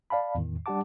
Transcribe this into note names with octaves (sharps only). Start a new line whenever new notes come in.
D5 F5 A5 B5
E2 A2 D#3
G3 D4 G4 F#5 A5 D6